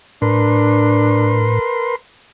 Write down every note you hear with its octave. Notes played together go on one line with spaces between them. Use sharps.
A2 D4 A#4 B4 C6